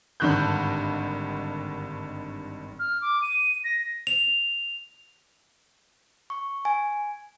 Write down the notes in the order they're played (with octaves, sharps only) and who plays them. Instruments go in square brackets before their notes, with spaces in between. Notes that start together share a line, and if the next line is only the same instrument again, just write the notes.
[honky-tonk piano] G#1 G2 D3 D#3 F#6 G6
[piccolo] F6
D6
D#7
A#6
[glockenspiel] F7
[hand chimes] C#6
G#5